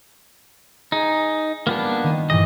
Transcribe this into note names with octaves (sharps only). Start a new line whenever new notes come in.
D#4 G#4
G3 A#3 B3 D4 F4
D#3 D#7
G2 A#2 E3 D#5